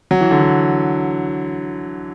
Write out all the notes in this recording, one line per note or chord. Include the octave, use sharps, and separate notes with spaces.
F#3
E3
D3
E3